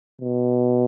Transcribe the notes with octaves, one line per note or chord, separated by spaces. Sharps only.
B2